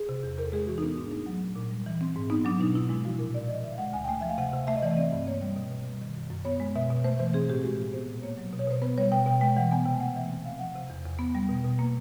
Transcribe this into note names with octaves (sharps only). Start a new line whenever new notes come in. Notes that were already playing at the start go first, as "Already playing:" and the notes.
Already playing: G#4
C3
E2
E2 A#4
A4
G#3 G#4
E3 F#4
D#4
B3 D4
G#2 D4
A3 D#4
F#3
A#2
A#2
G3
E3
C4
G#2
B3 D#4
F#3 D4
B2 D#4
B2 E4
G#3 E4
F3 F#4
A#2 A#4
A#2 D5
F3 D#5
D3 E5
F5
G#3 F#5
D2 G#5
G5
A3 G#5
F3 E5
F5
C3 F#5
C3
A3 E5
D#5
E3 D5
D#5
C4
G2
A#3 C#5
G3
B2
B2
G3
D#3
F#2
F#2
B3 C#5
G#3
B2 E5
B2
A3 C5
E3 C5
C4 G#4
A2 G4
G#3 F#4
F3
B3 C5
A#2
A#3 C#5
F#3
B2
C#5
B2 C5
B3 B4
G3 C#5
B2 G5
B2 G5
G#3 G5
E3 F#5
B3 G#5
C3 G5
A3 F#5
E3 E5
C4
C3 F5
F3 F#5
C3
E2
E2
B3
G3
B2
B2
A#3